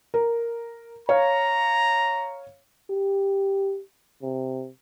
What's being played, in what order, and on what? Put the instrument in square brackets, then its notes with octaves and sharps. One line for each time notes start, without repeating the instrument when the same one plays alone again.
[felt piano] A#4
[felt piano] C#5 F5 [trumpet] A#5
[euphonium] G4
C3